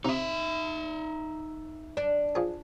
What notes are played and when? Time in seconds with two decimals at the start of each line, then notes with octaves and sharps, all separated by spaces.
0.05 C3 D#4 E5 D#6
1.97 D4
2.35 F3 G#4